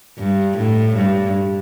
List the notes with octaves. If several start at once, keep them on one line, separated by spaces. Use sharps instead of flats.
G2
A2
G2